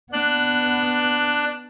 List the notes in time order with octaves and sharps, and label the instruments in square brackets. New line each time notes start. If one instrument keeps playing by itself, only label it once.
[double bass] B3 [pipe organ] D4 F#6